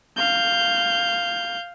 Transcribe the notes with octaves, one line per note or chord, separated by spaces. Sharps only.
F5 G6